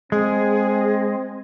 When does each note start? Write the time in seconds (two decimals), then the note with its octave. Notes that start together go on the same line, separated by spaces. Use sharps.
0.12 G#3 C4 G#4